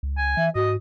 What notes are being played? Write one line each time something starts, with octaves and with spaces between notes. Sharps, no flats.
C#2
G#5
E3 E5
G#2 F#4 D#5